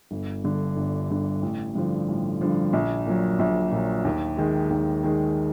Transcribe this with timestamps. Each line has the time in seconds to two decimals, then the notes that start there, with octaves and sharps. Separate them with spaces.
0.11 G1
0.44 G2 D3
0.76 G1
1.10 G2 D3
1.42 A1
1.75 G2 D3 F3
2.08 A1
2.41 G2 D3 F3
2.73 A#1
3.07 A#2 F#3
3.39 A#1
3.71 A#2 F#3
4.05 D#2
4.37 D#3 G#3
4.70 D#2
5.03 D#3 G#3